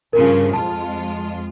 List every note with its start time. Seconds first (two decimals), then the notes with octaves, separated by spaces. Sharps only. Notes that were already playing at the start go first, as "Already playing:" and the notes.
0.13 G2 C#3 F3 A#4
0.53 F2 G#3 F4 A5